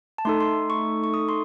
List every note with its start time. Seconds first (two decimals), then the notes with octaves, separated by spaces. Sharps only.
0.18 A5
0.25 A3 D#4 A4 C6
0.40 C6
0.70 C#6
1.04 C#6
1.14 D#6
1.29 C6